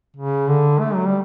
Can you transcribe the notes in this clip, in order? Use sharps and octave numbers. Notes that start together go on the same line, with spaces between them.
C#3
D3
A3
F#3
G3